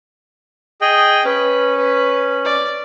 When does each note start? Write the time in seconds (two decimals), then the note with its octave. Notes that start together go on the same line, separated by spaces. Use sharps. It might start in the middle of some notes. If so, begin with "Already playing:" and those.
0.81 G#4 D#5 G5
1.24 C#4 B4
1.77 B4
2.44 D5